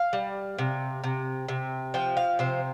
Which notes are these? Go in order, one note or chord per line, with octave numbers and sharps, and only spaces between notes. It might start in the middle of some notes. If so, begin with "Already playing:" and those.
Already playing: F5
G3
C3
C3
C3
F3 G5
F5
C3 C5